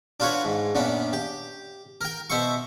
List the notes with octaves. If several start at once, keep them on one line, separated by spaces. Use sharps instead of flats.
D4 F4 F#4 B4 C#5
G#2
F#2 A#2 B3 D4
G4
A#4 G5
B2 C5 E5 C6 C#6